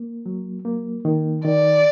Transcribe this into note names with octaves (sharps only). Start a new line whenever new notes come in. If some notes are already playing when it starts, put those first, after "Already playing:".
Already playing: A#3
F#3
A#3
D#3
D#3 D5